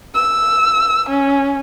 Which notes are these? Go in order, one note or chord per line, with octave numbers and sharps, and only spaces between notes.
E6
C#4